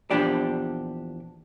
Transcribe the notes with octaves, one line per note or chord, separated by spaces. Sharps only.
E2 A#2 F3 D4 G4 D5